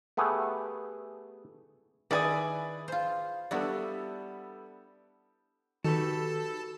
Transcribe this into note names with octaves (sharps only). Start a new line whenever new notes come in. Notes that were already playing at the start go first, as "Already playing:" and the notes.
A3 B3 G4 G#4
D#3 E4 G#4 B4 D5 G#5 D#6
F4 C5
G3 B3 D4 E4 F#4 A4
D#3 F#4 G4 A4 B4 A5